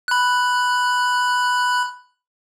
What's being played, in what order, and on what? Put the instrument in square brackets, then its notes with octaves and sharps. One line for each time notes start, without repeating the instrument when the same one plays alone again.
[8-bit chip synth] B5 F#6